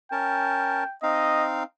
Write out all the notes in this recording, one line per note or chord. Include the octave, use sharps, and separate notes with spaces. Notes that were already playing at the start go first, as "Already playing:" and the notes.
C#4 A#4 G5 A5
C4 D#4 D#5 F5